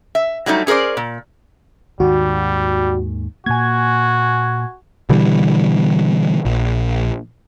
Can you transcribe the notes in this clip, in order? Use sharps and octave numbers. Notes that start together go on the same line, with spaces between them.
E5
F#3 G3 A3 D#4
C#4 G#4 A#4 C5 D5
A#2
D#2 G#2 D#3 G3 F#4
A#2 A#3 F#4 G#5 G#6
B2 D3 E3 G3
A#1